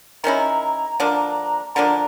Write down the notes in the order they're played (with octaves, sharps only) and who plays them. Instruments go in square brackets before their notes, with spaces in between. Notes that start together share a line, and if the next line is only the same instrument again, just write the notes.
[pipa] D#3 G#3 C#4 E4 [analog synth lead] A#5
[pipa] D3 F3 A#3 D4
[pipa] D3 F3 A#3 D4 [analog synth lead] A#5